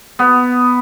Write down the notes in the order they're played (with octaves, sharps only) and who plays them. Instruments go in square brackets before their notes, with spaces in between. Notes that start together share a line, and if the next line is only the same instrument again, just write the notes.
[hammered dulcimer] B3